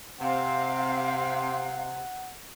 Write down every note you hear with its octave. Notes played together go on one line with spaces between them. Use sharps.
C3 C4 F5 F#5